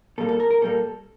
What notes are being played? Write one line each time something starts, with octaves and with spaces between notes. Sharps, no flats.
A#2 G3 A#3 A4
A4
A#4
A#4
A#2 G3 A#3 A4